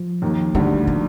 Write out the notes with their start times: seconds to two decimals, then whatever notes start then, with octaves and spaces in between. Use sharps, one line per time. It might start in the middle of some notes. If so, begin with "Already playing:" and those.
Already playing: F3
0.22 D#2 D#3
0.54 D2 D3 G3
0.87 F3